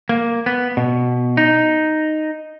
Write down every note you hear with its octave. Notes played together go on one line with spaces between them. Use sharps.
A#3
B3
B2
D#4